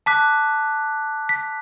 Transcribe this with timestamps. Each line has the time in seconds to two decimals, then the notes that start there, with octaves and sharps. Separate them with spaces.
0.06 A5 D6 F#6 B6
1.29 B6